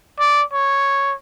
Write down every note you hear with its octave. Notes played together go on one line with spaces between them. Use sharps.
D5
C#5